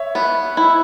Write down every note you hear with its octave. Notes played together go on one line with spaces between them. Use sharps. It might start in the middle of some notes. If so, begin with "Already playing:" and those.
Already playing: C#5 E5
B3
E4